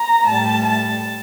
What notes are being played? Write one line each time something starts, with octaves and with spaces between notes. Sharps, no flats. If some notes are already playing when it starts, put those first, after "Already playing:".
Already playing: A#5
A2 G3 A5
A5